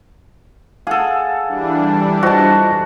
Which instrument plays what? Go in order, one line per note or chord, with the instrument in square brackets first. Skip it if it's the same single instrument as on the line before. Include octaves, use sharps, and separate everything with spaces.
[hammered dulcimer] G#4 A4 [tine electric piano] F5 F#5
[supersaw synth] E3 G3 D4
[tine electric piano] F4 C5 D#5 [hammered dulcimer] F#4 A5